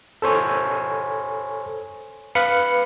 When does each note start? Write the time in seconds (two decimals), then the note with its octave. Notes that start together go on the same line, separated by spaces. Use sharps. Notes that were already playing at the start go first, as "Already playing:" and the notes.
0.22 A4 C5 C#5 G#5
2.35 B4 F5 B5 C#7